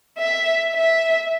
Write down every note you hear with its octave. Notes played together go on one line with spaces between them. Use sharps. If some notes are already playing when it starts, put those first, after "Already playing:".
E5
E5